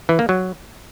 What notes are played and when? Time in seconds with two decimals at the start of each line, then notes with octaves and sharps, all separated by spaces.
0.09 E3
0.19 A#3
0.29 F#3